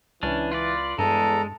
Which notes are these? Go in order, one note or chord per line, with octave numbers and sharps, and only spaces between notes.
C#2 E3 C#4 D4
F4 B4 D5
E2 G2 G#3 A4 A#5